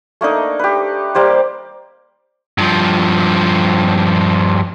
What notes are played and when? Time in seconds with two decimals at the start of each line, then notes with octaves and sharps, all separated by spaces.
0.21 A3 A#3 D4 D#4
0.59 G4 B4
1.15 G3 A#3 G4 C5
2.58 G2 F3